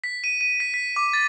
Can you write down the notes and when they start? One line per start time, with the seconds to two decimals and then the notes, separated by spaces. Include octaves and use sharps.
0.04 B6
0.24 D#7
0.41 D#7
0.60 B6
0.74 B6
0.96 D6
1.13 A6